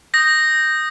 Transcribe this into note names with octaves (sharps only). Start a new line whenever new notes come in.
D#6 G6 A#6